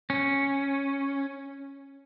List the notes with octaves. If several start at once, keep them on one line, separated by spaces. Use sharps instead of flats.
C#4